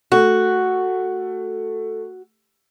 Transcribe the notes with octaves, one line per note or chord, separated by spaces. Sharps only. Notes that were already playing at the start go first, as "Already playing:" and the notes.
A3 F#4